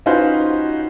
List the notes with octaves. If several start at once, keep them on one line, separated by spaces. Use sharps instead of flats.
C#4 D#4 F4 F#4 B4 C5